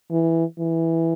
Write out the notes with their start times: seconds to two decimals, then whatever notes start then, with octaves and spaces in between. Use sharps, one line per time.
0.11 E3
0.59 E3